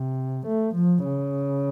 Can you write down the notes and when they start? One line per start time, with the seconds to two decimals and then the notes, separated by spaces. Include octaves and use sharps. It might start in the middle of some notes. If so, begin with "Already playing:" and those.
Already playing: C3
0.46 A3
0.75 F3
1.04 C#3